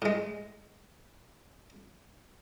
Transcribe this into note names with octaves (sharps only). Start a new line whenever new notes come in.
A2 G#3